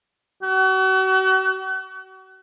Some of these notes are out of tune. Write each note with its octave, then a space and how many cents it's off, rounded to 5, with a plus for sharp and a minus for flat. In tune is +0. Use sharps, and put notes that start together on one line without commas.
F#4 +40